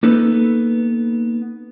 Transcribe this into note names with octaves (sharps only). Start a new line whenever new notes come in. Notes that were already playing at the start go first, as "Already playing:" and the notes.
A#3 B3 D#4 A4 B4